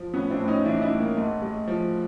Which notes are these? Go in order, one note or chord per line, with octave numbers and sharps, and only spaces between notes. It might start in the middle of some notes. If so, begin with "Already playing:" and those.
Already playing: F3
A2 B3 C#4
C4 D4
A2
C#4 D#4
E3 D4 E4
D#4
D4 E4
A2
A#3
G#2 A3
G#3
F3